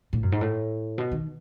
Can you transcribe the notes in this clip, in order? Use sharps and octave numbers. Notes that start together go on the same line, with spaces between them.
A2
F#2
G#2
A2
B2
D#3